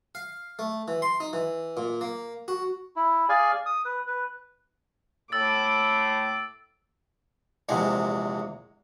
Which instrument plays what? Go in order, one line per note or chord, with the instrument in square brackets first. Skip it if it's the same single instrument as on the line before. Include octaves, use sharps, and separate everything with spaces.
[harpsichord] F5
A3
E3
C6
D#4
E3
A#2
A#3
F#4
[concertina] E4
G#4 D5 F5 G#5
D#6
B4
B4
[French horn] A2 [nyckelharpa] D6 [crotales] E6 A6
[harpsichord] A#1 E2 C3 G#3